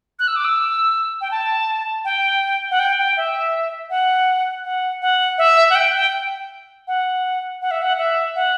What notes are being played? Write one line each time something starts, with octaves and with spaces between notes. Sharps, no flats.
F#6
E6
D6
E6
G5
A5
G5
F#5
G5
G5
E5
F#5
F#5
F#5
E5
F#5
G5
G5
F#5
F#5
E5
F#5
E5
F#5